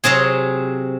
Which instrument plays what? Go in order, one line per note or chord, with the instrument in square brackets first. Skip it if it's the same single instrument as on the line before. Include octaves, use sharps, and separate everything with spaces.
[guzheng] C3 F#3 C4 G#4